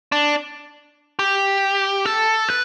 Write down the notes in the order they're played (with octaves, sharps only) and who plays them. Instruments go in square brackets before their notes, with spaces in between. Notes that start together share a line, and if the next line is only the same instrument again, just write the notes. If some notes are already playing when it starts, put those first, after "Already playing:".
[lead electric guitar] D4
G4
A4
B4